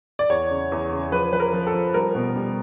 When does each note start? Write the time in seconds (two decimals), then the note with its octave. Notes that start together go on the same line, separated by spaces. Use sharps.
0.19 D5
0.30 E2 C#5
0.51 C#3
0.72 E2
0.92 C#3
1.12 F3 B4
1.33 F3 B4
1.40 A#4
1.53 F3
1.67 A4
1.74 F3
1.94 G3 A#4
2.15 B2
2.35 G3